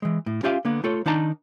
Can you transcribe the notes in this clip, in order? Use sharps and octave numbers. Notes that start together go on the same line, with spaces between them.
E3 G#3
A2
C#4 F4 G4 E5 F5 G#5
D3 A#3 B3
A3 F4 A4 C#5
D#3 D4 D#4 A5 A#5